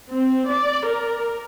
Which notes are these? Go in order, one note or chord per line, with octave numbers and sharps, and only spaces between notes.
C4
D5
A#4